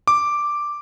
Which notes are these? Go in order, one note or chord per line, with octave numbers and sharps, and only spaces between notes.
D6